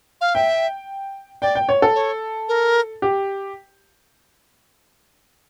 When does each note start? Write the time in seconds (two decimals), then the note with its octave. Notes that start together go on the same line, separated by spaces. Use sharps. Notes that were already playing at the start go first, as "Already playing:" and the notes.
0.21 F5
0.35 E5 G5
1.42 D5 G5
1.55 G5
1.69 C#5
1.82 A4
1.95 C#5
2.49 A#4
3.02 G4